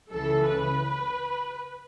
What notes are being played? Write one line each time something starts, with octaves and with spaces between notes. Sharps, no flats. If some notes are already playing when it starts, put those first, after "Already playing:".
C#2 C#3 E3 A4
B4